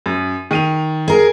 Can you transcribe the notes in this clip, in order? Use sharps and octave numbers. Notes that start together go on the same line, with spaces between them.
F#2
D#3 D#7 F7
G#4 A#4